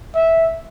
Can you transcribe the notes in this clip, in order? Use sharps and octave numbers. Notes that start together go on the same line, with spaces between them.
E5